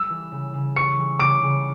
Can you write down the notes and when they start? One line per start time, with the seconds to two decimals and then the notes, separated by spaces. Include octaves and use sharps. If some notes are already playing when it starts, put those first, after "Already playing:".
Already playing: G3 E6
0.10 E3
0.32 C#3
0.54 C#3
0.76 G3 C#6 C#7
0.97 E3
1.19 C#3 D6 D7
1.42 C#3